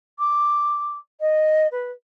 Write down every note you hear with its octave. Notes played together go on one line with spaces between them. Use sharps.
D6
D#5
B4